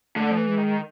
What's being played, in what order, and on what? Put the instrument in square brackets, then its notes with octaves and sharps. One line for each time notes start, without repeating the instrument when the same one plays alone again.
[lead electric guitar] D3 [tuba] A3
[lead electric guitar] F3
E3
[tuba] G#3
[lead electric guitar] D#3